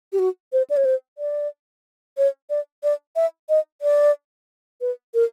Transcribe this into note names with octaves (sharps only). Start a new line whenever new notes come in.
G4
F#4
C5
D5
C#5
C5
D5
C#5
D5
D5
E5
D#5
D5
B4
A#4